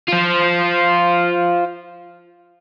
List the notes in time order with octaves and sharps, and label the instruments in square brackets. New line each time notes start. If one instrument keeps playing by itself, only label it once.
[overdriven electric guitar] F4 C5